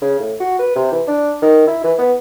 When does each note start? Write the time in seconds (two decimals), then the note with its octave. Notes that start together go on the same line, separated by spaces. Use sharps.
0.02 C#3
0.20 A2
0.40 F#4
0.59 B4
0.76 C3
0.92 E3
1.07 D4
1.42 D#3
1.67 E4
1.84 E3
1.99 B3